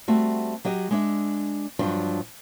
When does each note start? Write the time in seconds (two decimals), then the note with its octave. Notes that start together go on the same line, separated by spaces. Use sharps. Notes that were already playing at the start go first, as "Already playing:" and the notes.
0.08 G3 A3 C4 F#4
0.65 F#3 G4 D#5
0.91 G#3 D4 E5
1.79 G2 F3 F#3 D4